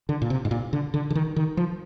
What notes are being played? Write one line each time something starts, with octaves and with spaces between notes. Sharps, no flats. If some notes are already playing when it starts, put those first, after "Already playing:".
D3
A#2
C3
G#2
A#2
D3
D3
D3
D#3
D#3
F3